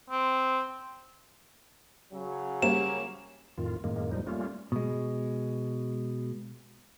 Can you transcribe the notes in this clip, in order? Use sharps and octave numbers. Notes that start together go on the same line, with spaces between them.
C4
C#3 F#3
G3 A#3 C#4 E7
F2 A2 D#3 F4
F#2 A2 D#3 G#3 A#3
E2 A2 F3 G3 D#4
G3 A3 A#3 C#4 F4
B2 G#3